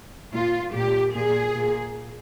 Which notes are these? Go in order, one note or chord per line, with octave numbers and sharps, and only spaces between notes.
A#2 F4
A#2 G4
A#2 G#4
A#2